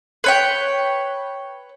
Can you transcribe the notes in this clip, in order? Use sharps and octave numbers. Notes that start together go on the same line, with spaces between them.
B4 C#5 G5